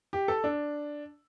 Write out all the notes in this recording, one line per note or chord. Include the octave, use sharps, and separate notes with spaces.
G4
A4
D4